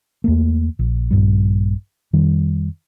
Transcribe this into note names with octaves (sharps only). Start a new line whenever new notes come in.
E2 A3 A#3
A#1
A#1 G2 G3
F2 D#3 G3